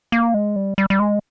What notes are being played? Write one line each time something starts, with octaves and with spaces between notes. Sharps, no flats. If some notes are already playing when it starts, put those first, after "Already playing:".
A#3
G#3
G3
G3
G3
G#3